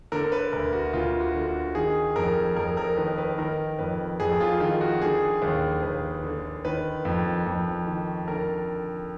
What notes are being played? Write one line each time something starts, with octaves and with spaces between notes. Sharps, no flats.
D3 A#4
B4
D2 A#4
F#4
D2 F4
F#4
D3
F#4
D#3 G#4
F2 A#4
F2 A#4
A#4
D#3 B4
B4
D#3 A#4
F2 B4
F2 G#4
F4
D#3 F4
F#4
D3 G#4
D#2
D#2 B4
D3
D#3 B4
F2
F2
D#3
D3 A#4